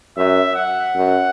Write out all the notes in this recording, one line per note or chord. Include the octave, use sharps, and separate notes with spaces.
F#2 E5
F#5
F#2